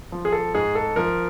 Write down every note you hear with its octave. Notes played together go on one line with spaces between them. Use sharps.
F3
G#4
A4
G#2 G#4
A4
F3 A#4